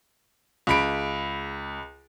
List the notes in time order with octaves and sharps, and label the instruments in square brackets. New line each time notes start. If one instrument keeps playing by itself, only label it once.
[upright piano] C#2 B5 D7